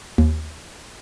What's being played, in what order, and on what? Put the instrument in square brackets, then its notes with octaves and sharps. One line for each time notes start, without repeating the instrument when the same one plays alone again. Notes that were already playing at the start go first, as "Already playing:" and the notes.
[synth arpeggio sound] D#2